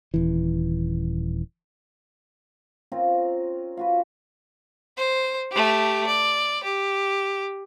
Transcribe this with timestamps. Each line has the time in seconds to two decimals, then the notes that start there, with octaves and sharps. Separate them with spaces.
0.14 D#1 E3
2.92 C4 C#4 F4 A#4
3.77 F4 F#4 B4
4.97 C5
5.51 A3 G4
6.07 D5
6.64 G4